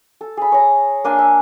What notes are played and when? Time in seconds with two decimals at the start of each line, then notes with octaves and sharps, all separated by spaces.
0.21 A4
0.37 G#4 B5
0.52 C#5 A#5
1.04 A#3 D4 G#5 C6
1.19 E5